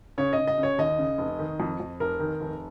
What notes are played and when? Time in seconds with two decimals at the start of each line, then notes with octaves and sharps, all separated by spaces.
0.18 C#3 C#5
0.33 D#5
0.38 C#3
0.47 D#5
0.58 C#3
0.63 C#5
0.78 D#2 D#5
0.98 C#3
1.18 F1
1.39 D#3
1.60 F2
1.80 F2
2.00 F1 A#4
2.20 D#3
2.41 F1